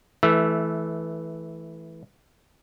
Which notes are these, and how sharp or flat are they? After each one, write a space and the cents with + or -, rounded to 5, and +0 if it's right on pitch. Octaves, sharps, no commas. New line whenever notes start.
E3 -5 A3 -20